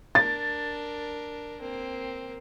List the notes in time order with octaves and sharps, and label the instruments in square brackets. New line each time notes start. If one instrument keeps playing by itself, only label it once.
[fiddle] D4 A#4 [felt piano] A6
[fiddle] A#3 C4